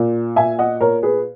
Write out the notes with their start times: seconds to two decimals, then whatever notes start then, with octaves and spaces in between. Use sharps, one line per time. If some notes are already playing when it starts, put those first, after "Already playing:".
Already playing: A#2
0.36 A#2 E5 G#5
0.59 D#5 F#5
0.81 A#2 A#4 C#5
1.03 G#4 B4